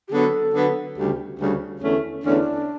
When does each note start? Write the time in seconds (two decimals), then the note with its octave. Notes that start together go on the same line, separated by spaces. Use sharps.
0.08 G4
0.12 D3 F#3 B3 A4
0.54 D3 F#3 B3
0.97 D2 C#3 G3 G4
1.39 D2 C#3 G3
1.81 E2 D3 A3 C#4
2.23 E2 D3 A3 C#4 D4